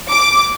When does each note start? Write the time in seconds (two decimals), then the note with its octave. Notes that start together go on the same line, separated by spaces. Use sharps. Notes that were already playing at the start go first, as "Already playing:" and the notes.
0.11 D6